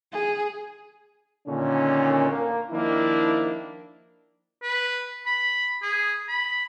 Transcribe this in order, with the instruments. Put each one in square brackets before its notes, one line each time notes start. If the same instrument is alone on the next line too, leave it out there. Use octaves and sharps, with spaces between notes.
[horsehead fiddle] G#4
[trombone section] A#2 D3 D#3 C#4
A#3
D#3 F3 A#3 D4 E4
[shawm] B4
B5
G#4
B5